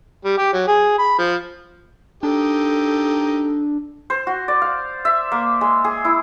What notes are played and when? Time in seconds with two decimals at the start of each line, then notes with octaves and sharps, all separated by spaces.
0.24 G3
0.37 G4
0.53 F#3
0.67 G#4
0.99 B5
1.18 F3
2.23 D4 D#4 G4 A4
4.10 C5
4.27 F#4
4.48 D5
4.62 F5
5.05 E5
5.32 A#3
5.61 G#3
5.84 G#4
6.05 E4